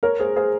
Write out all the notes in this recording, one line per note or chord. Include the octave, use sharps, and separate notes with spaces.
A#4 C#5
G#4 C5
G#4 C5